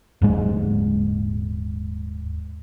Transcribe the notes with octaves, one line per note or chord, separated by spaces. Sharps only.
D#1 G#2 G#3